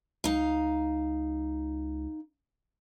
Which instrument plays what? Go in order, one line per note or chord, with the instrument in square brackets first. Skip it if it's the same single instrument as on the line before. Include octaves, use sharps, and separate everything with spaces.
[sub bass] C#2 [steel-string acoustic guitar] D#4 F5